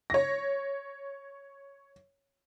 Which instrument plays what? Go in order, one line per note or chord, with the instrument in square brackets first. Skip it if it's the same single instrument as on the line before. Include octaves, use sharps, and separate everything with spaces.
[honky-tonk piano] C#5 A#6